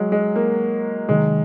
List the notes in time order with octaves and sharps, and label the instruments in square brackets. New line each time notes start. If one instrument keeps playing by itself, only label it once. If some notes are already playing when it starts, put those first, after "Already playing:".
Already playing: [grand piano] F#3 G#3
G#3
A#3
[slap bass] C3 D#3 F#3 [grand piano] G#3